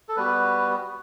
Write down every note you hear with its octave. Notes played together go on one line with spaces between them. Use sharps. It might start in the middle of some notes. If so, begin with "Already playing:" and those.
A4
G3 B3 F#4 B4